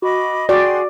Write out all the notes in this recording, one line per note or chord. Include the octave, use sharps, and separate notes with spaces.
F#4 D#5 B5 D6
F#4 G#4 D5 G5 C6